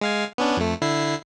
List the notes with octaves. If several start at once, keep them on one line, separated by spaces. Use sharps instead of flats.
G#3 F5 G#5
B3 C#4 D4
F2 A3
D3 E4 C7